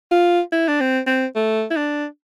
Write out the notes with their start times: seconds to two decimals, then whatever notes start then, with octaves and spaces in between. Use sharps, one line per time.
0.11 F4
0.52 E4
0.68 D4
0.80 C4
1.07 C4
1.35 A3
1.71 E4
1.77 D4